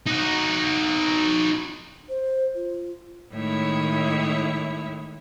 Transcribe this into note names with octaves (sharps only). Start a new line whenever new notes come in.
D#4 F#4
C5
F4
A2 D#3 G#3 E4 C#5 E5